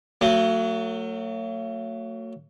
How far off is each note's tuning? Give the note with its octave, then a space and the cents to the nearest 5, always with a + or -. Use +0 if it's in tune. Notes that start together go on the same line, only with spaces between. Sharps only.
F#3 +0 A3 +45